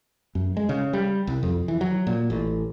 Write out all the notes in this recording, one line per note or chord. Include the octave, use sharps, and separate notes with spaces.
F#2
G#3
C#3
G3
C2
F2
E3
F#3
A#2
A1